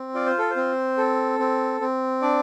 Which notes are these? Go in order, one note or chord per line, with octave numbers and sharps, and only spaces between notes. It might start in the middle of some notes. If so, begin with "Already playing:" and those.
Already playing: C4
F4 D5
C5
A4
C5
C4
A4
C4
C4
D4 D5